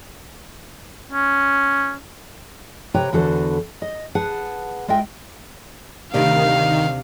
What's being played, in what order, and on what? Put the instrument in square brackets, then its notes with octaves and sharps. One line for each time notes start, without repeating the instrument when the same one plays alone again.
[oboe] C#4
[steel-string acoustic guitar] C3 G4 B4 C#5 G5 A#5
E2 D3 F#4 A4 B4 C5
D#5
G#4 B4 F#5 A5
G#3 F4 D#5 E5 G5
[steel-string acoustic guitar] D2 C3 D5 [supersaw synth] D#3 [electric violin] F5